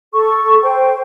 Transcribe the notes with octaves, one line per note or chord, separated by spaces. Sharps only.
A4 C#6
C5 G5